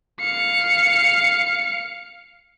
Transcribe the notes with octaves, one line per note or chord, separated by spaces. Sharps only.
F5 C#7